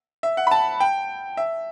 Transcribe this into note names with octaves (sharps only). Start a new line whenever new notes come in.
E5
F#5
B5
A5
G5
E5